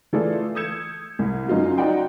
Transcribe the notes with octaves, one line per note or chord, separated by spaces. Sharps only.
E3 A3 F4 G#4 A4 D5
D#6 E6 G6 G#6 C#7 E7
C2
F#2 F#3 D#4 F4 F#4
D#4 F#4 D5 F#5 G5 C6